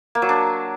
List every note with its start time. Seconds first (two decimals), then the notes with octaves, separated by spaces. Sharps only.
0.15 A#3
0.22 F#3
0.29 D4